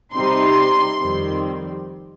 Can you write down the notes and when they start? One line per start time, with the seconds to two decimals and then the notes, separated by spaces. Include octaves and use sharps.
0.13 C3 G3 C4 D#4 C6
0.98 F2 D#3 G3 C4